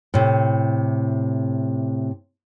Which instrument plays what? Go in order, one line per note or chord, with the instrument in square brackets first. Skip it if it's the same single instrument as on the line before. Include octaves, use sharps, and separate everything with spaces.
[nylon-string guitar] A2 C3